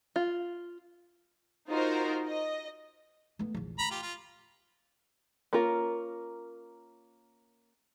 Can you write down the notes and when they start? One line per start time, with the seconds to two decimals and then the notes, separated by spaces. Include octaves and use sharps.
0.16 F4
1.68 D#4 F4 F#4 A#4 C5
2.29 D#5
3.39 A3 B3
3.54 A#1 E2
3.79 A3 A#5 B5
3.91 F4 G4
4.02 F4
5.53 A#3 C#4 F4 A#4